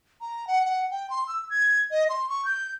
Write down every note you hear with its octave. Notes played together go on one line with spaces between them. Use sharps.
A#5
F#5
F#5
G5
C6
E6
G#6
D#5
C6
C#6
G6